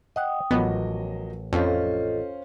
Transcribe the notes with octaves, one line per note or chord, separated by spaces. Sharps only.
D#5 F#5 G5 D#6
A1 F3 F#3 B3 A#4 D#5
F2 C#4 F4 A4 C5 D#5 F5